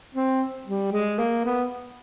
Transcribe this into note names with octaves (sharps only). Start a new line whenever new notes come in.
C4
G3
G#3
A#3
B3